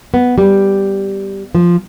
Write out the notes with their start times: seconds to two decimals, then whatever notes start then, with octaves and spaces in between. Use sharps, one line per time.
0.14 B3
0.38 G3
1.55 F3